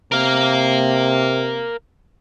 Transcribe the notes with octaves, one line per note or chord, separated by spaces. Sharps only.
C3 A#4 F5